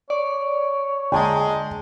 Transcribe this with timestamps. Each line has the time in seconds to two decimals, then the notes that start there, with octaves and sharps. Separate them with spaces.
0.10 C#5 D5
1.12 D3 G#3 G5 A5 A#5